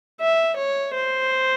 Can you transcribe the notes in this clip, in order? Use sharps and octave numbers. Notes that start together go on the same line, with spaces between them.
E5
C#5
C5